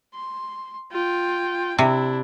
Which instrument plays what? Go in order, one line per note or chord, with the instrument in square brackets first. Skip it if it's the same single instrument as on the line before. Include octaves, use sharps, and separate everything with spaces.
[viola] C6
F4 G5
[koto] C3 [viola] D4 E4